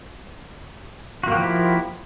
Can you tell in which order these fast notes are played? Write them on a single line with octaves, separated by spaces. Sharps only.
F#4 A#3 G4 F3 E4